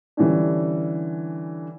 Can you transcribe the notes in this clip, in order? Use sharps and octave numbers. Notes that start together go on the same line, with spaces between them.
D3 E3 G3 C#4 D4